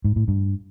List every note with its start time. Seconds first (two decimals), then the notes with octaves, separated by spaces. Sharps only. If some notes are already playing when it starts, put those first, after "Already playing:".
0.04 G#2
0.16 A2
0.28 G2